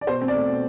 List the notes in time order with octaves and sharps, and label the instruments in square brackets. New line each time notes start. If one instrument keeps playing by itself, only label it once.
[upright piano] D5
B2 C5
C4
D5
A3
B2